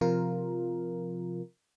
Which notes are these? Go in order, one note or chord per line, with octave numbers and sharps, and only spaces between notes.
C3 F3 F4 A#4